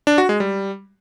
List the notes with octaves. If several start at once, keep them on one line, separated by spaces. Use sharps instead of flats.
D4
F#4
G#3
G3